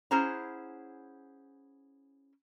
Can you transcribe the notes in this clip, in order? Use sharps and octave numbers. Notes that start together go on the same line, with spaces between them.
C#4 E4 G#4 C5 F#5 A#5